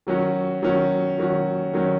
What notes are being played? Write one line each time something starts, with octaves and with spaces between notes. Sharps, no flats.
D#3 F#3 C#4 F#4
D#3 F#3 C#4 F#4
D#3 F#3 C#4 F#4
D#3 F#3 C#4 F#4